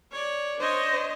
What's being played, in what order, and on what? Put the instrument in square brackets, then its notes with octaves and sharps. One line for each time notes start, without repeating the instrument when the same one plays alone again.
[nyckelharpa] C#5 D5
[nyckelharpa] D4 C#5 [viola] C5 D#5